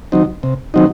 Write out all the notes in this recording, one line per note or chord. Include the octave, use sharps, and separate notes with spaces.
D#3 F#3 C4 D#4
C3
D#3 F#3 C4 D#4